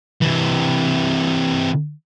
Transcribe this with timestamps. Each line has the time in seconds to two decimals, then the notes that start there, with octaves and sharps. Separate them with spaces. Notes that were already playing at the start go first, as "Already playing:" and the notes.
0.22 C3 E3